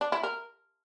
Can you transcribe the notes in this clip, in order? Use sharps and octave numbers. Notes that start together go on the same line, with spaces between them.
D4
E4
A#4